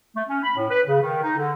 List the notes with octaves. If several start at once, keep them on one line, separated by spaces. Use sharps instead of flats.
A3
C#4
B5
A2
B4
C#3
D#3
D#4
D3